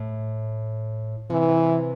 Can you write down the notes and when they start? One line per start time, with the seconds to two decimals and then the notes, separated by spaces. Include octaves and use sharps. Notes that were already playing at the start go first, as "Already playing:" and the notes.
Already playing: A2
1.30 C3 E3